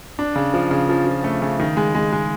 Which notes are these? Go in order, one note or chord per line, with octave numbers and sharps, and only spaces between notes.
D4
C#3
F3
C#3
F3
F3
A3
C#3
D#3
G#3
G#3
G#3